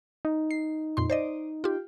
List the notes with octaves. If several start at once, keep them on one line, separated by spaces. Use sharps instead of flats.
D#4
C7
F2 A#2 C6
C5 D5 D#5
F4 G4